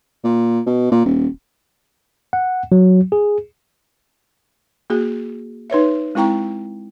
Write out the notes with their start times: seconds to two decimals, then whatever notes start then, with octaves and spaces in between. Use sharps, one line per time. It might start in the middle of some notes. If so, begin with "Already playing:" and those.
0.24 A#2
0.66 B2
0.92 A#2
1.05 D#1
2.33 F#5
2.72 F#3
3.12 G#4
4.90 A#3 F#4 G#4
5.70 D#4 B4 C#5 E5
6.15 G#3 C4 E4 G5 A#5 C#6